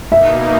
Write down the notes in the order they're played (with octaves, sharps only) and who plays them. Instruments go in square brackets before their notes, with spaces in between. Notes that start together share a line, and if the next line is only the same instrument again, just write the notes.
[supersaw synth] B2 A#3 D#4 [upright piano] E5